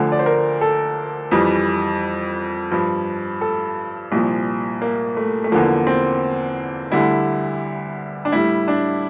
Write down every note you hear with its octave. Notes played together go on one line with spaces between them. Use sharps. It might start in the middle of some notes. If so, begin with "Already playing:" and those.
Already playing: D2 D3 F3
D5
C5
A#4
A4
F2 E3 G3
G2 F3
A4
C2 A#2 F3
A#3
A3
A3
E2 D3 F3 A#3
C4
D2 D3 G3 E4
D4
A2 G3 E4
D4